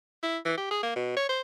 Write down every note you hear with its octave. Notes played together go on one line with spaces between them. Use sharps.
E4
E3
G4
G#4
A#3
B2
C#5
C5